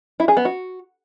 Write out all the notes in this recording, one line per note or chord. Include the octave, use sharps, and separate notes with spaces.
E4
G#4
B3
F#4